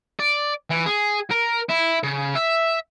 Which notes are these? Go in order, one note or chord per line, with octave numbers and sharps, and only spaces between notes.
D5
E3
G#4
A#4
E4
C#3
E5